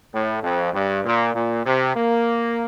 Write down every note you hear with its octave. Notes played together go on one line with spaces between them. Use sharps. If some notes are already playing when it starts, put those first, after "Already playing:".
A2
F2
G2
A#2
A#2
C3
A#3